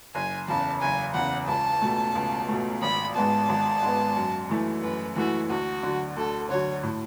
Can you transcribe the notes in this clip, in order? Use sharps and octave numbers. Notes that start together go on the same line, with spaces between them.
F#1 G#5
E2 C#3 A5
F#1 G#5
E2 C#3 F#5
C#2 A5
B2 A3
C#2
B2 A3
G#1 B5
G#2 G#3 B3 A5
G#1
G#2 G#3 B3
F#2
E3 A3 E4
F#2 B4
E3 A3 E4 F#4
D2 F#4
D3 F#3
D2 A4
D3 F#3 C#5
A2